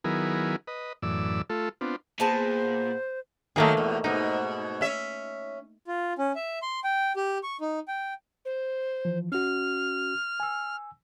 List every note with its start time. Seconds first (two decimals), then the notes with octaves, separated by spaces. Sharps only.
0.04 D#3 F#3 B3 E4 G#4 A#4
0.67 B4 D#5
1.02 F#2 A2 E3 D5 E6
1.50 A3 F4 A4
1.81 B3 C4 D4 F4
2.20 A#2 B3 G#4 C5 A5
3.56 D#3 F#3 A3 A#3 G#4
3.77 E2 B2
4.04 G#2 B2 D#4
4.81 C#4 E5
5.87 F4
6.18 C#4
6.35 E5
6.62 C6
6.84 G5
7.16 G4
7.43 C#6
7.61 D#4
7.88 G5
8.45 C5
9.05 E3 F3
9.32 C#4 F#4 F6
10.40 G#5 E6